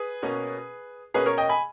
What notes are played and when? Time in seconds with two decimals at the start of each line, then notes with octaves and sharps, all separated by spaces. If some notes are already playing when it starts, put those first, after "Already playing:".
Already playing: G#4 B4
0.23 B2 A#3 C#4
1.14 B2 A#3 C#4 G#4 B4
1.26 A#4 C#5
1.38 D#5 G5
1.49 G#5 B5